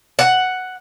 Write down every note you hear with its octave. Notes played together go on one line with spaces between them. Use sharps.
F#5